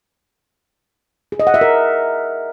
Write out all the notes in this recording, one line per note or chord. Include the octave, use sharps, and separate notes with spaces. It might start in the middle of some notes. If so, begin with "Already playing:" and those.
G#4
D#5
F#5
E5
A#4